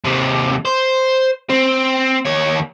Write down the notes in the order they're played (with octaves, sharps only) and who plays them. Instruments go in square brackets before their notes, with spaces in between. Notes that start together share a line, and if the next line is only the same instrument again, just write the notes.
[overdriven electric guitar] D#2 C3
C5
C4
D#2 C#5